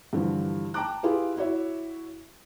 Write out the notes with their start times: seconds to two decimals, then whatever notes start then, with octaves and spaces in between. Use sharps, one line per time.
0.13 G2 D3 E3 F3 G3
0.74 G5 A5 A#5 D6 F#6
1.03 E4 F4 G4 G#4 B4
1.37 E4 F#4 C#5 E5